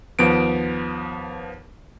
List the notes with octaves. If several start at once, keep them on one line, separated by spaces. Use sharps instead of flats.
D#2 F3 B3 D7